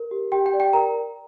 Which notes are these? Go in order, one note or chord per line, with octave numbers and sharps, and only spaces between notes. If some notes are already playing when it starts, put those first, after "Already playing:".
Already playing: A#4
G4
G4 G5
G5
D5
G5
A#4 A#5